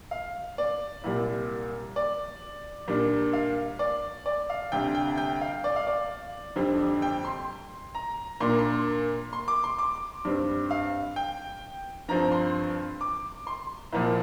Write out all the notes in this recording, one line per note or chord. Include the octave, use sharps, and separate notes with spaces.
F5
D5
C2 A#2 G3
D5
A#2 G3 D4
F5
D5
D5
F5
D2 C3 G3 G5
G5
G5
F5
D5
F5
D5
F2 D3 G3 C4
G5
C6
A#5
A#2 A#3 D4 C6
A#5
C6
C6
D6
C6
D6
G2 G3 C4
F5
G5
G2 F3 C4 A#5
C6
D6
C6
C2 A#2 F3